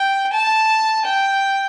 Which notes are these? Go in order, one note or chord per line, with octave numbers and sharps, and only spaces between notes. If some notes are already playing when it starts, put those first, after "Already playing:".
Already playing: G5
A5
G5